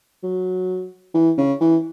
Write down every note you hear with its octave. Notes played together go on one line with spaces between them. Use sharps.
F#3
E3
C#3
E3